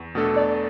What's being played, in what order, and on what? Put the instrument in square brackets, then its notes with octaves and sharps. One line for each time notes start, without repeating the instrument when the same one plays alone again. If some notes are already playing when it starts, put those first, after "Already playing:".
Already playing: [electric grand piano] E2
B2 A3 D4 A4
[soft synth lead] D5